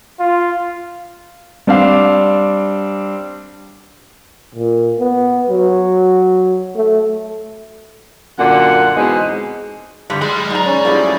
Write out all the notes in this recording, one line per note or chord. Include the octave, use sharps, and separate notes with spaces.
F4
G3 C4 D4 F5
A#2
B3
F#3
A3
F#2 A#2 D3 F#5
E2 B2 G#3 C4 D#4 G#4
G2 D3 G3
G#3 D5 B5
G#2 A#5
C#4
G#2 F3 G3 A3 A#3 E4 G#4